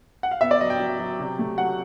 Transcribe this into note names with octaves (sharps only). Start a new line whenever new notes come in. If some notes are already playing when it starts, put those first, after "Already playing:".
F#5
F5
B3 E5
D5
F#3 D#5
G5
F#3
F#3
C3
A3
F#3 F#5